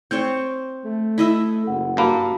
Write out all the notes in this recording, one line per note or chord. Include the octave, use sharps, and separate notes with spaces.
C4 C5 C#5 G6
A3
E4 D#5 E5
F#1 F#5
G2 A#3 F#4 A5 B5